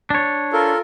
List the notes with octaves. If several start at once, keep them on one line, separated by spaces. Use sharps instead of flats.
D4 C#5
F4 A4 A#4